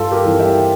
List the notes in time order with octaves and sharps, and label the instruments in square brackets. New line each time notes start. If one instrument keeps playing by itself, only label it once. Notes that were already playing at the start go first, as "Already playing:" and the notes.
Already playing: [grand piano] G2 F4 A4
G4 A#4
E3 G3 C4
E5 G5